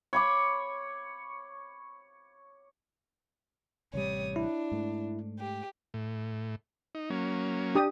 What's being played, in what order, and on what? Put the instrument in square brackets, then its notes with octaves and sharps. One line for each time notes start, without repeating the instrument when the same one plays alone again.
[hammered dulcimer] C#5 B5 D6
[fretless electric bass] A1 C3 G3 [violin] C#5 D#6
[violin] D4 [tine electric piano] E4
[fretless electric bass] G#2 A3
[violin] G4
[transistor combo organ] A2
D#4
F#3 A#3 C#4
[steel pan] D4 G4 D#6